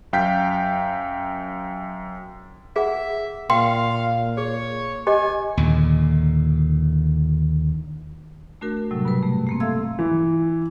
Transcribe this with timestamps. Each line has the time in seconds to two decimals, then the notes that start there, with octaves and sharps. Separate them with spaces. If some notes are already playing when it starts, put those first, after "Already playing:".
0.13 F#2 F5 G5 G6 B6
2.76 G#4 E5 F#5
3.50 A#2 F5 G5 C6
4.37 G#4 C#5
5.07 G4 D#5 G#5 D6
5.57 D#2 A#2 D3
8.61 A3 D4 F#4 A#4
8.91 A2 C3 F#3 G3
9.05 G2 B2 B4
9.23 A3
9.47 A3 A#3 C4
9.60 A4 E5 F5 C6 E6 G#6
9.99 E3